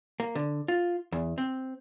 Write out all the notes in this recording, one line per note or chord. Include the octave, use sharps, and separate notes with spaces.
A#3
D3
F4
E2
C4